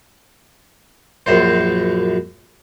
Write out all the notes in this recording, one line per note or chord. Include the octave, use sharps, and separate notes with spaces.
A#1 F#2 C5